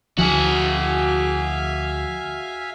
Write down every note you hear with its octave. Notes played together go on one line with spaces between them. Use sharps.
D2 F3 F#4 G#4 E5 F5 G#5